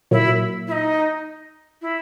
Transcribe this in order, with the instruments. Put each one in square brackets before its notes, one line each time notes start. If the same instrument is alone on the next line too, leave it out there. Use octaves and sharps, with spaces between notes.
[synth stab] A#2 F#3 A#3 [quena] E4
[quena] E4
D#4
E4